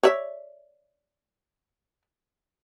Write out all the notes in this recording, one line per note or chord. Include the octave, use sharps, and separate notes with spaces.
C#5 D5 E5